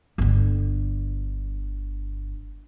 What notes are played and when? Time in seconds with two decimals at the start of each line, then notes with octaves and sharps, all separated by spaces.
0.18 G1 D3